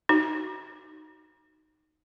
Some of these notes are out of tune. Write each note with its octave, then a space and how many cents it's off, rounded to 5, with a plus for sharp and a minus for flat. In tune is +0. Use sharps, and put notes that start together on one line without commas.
D#4 +0 F#4 +15